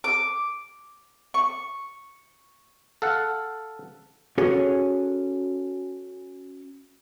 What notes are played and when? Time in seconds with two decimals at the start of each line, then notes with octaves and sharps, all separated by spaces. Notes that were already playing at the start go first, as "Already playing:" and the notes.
0.04 D6
1.34 C#6
3.02 A4 F5 F#5
4.38 C#4 F#4 G#4 A4 C#5